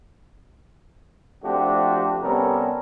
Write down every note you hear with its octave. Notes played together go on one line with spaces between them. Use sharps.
F3 A3 C4 D4 F#4 G4
C3 G3 B3 C#4 A4 A#4